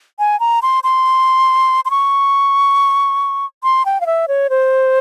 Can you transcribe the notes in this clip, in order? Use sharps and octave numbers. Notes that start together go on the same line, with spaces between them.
G#5
A#5
C6
C6
C6
C#6
C6
G5
F5
E5
C#5
C5